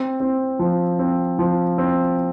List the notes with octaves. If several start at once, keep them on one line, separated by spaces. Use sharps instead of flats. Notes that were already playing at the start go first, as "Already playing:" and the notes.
Already playing: C4
C4
F3
C4
F3
C4